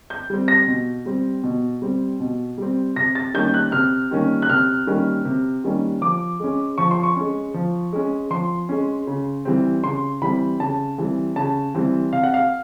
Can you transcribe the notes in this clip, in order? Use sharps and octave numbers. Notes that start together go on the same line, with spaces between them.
G6
G3 C4
A#6
B2
G3 C4
B2
G3 C4
B2
G3 C4
C3 A#6
A6
D#3 G3 A#3 C#4 G6
F#6
C3 F6
D#3 G3 A#3 C#4
F#6
C3 F6
D#3 G3 A#3 C#4
C3
D#3 G3 A#3 C#4
F3 D6
G#3 C#4
F3 C#6
C6
C#6
G#3 C#4
F3
G#3 C#4
F3 C6
G#3 C#4
C#3
E3 G3 C4
C#3 C6
E3 G3 C4 B5
C#3 A5
E3 G3 C4
C#3 A5
E3 G3 C4
C3 F5
F#5
F5